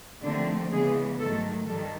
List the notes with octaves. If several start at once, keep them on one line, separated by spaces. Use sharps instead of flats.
D#2 D3 F3 A3 C4 D4
C#3 E3 G#3 B3 G#4
G#2 D#3 F#3 A3 A4
G2 D#3 G3 A4